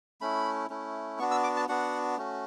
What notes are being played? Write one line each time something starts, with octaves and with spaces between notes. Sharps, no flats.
A3 C#4 E4 B5
A3 C#4 E4
B3 D4 F#4 C#6
E6
D6
A5
B3 D4 F#4 F#5
A3 C#4 F#4